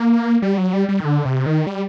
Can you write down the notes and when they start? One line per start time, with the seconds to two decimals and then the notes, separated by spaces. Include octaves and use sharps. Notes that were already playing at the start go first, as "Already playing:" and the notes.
Already playing: A#3
0.42 G3
0.58 F#3
0.73 G3
0.89 G3
1.00 D#3
1.05 D3
1.25 C3
1.46 D#3
1.67 G3